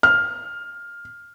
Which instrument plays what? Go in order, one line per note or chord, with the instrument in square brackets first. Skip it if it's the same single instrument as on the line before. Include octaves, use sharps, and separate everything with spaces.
[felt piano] F6